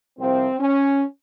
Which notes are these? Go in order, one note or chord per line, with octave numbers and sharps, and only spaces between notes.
C2 C3 F3 C4
C#4